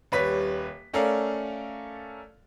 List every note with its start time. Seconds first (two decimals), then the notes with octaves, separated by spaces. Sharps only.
0.12 D#1 G3 B4 C#5 B6
0.93 A3 C#4 A4 A#4 D5 F5